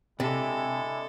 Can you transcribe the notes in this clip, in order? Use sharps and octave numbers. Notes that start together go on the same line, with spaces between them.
C3 G#3 D4 E4 A4